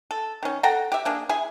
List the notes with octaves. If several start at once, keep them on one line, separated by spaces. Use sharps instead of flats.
A4
D#3 C#4
A4 F#5 G5 A#5
G4 E5
A#3 D4 G#4
E4 G#4 G#5